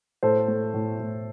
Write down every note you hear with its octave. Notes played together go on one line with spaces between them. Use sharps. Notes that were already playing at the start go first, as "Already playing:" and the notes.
A2 A4 C5
A3
A2
A2